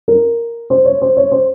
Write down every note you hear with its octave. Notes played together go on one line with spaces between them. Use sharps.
A#4
C5
C#5
C5
C#5
C5